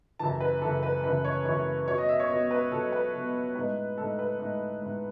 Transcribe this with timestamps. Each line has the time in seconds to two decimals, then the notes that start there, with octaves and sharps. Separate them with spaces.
0.19 F#2 C#3 E3 A5
0.40 B4
0.62 F#2 C#3 E3 A4
0.83 B4
1.04 F#2 C#3 E3 B4
1.25 C#5
1.45 F#2 C#3 E3 C#5
1.88 B2 F#3 B3 C#5
1.98 D#5
2.09 E5
2.20 C#5
2.30 B2 F#3 B3 D#5
2.51 B4
2.71 B2 F#3 B3 A4
2.92 B4
3.14 B2 F#3 B3
3.55 A2 G#3 D#4 B4
3.98 A2 G#3 D#4 A4
4.19 B4
4.39 A2 G#3 D#4
4.82 A2 G#3 D#4